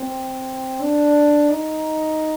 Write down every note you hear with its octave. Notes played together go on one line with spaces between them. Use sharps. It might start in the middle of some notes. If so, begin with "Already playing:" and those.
Already playing: C4
D4
D#4